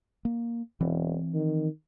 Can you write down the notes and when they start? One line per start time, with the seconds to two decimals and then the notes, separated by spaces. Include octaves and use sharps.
0.25 A#3
0.81 E1 E3 C4
1.34 D#3